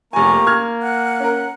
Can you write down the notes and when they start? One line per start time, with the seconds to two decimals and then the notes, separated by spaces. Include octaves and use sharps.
0.13 F1 A#3 G4 G#5 A#5 C#6
0.47 F6 G#6
0.81 F#5 F#6
1.20 C#4 A#4